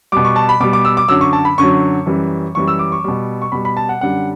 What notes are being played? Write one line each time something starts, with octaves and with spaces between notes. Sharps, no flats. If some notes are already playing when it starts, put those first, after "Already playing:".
B2 G3 D6
C#6
A5
B5
B2 G3 D6
D6
E6
D6
F#2 D3 F#3 E6
C#6
A5
B5
F#2 D3 F#3 C#6
F#2 E3 G3
F#2 E3 G3 C#6
E6
D6
C#6
B2 G3
C#6
B2 G3 B5
B5
A5
F#5
F#2 D3 G3 F#5